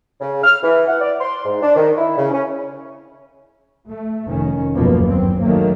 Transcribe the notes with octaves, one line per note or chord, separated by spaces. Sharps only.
C#3
F6
E3
F#5
D5
C6
G#2
D4
D#3
E4
C#3
C#4
A3
F1 D#3 C#4
F#1 D#2 B2 F3 A#3 B3
G2 F#3 C4
D#3 F#3 A3 A#3